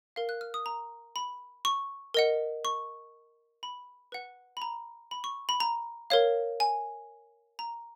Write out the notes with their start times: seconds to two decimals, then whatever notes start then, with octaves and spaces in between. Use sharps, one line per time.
0.16 A#4 F5
0.29 F#6
0.41 F6
0.54 D#6
0.66 A#5
1.16 B5
1.65 C#6
2.14 A#4 D#5 F#5
2.65 C#6
3.63 B5
4.12 B4 F#5
4.57 B5
4.62 A#5
5.11 B5
5.24 C#6
5.49 B5
5.60 A#5
6.10 A#4 C#5 F5
6.60 G#5
7.59 A#5